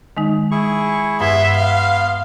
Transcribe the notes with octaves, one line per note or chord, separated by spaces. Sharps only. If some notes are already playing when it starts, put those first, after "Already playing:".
D#3 G#3 D#4
E4 G#4 C#6
G2 B3 E5 C6 G#6
F5